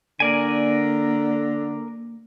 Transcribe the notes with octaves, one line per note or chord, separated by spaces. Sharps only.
D3 A#3 A#4 D5 G#5